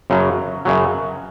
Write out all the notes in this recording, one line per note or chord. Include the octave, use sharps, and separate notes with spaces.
F#2 C#3 F#3
F#2 C#3 F#3